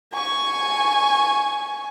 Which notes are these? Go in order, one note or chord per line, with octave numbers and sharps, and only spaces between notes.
G#5 C#6